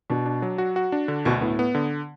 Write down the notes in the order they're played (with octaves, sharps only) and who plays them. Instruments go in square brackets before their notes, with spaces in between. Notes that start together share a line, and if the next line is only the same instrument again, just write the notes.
[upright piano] B2 [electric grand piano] D4
[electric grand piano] D4
F#3
F#4
F#4
D4
D3
[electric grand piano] D2 [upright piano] B2
[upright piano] A2 [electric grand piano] B3
[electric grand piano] B3
D3